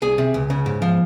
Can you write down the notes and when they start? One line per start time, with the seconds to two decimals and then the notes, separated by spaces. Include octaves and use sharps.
0.02 C2 G#4
0.18 C3
0.34 C#2
0.50 C#3
0.66 G#2
0.82 F3